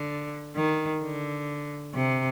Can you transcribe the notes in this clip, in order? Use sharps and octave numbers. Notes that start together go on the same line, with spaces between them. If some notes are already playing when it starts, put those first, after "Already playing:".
Already playing: D3
D#3
D3
C3